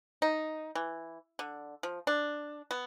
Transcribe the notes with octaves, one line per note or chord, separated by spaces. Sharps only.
D#4
E3
D3
F3
D4
B3